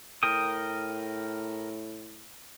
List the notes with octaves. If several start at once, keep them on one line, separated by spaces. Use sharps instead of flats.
A2 A#4 G5 D#6